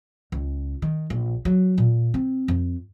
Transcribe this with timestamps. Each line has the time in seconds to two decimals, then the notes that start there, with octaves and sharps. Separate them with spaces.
0.32 C#2
0.82 D#3
1.10 A#1
1.45 F#3
1.78 A#2
2.14 C4
2.48 F2